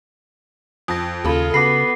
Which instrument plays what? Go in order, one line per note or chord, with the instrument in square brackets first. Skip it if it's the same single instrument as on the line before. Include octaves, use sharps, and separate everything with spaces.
[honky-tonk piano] F2 [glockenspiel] D#6 A#6
[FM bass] D#2 [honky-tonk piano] C#3 B5 [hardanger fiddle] F4 A4
[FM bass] C#3 [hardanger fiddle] B3 [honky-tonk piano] F#4 B5 [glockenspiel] D6 A#6 C7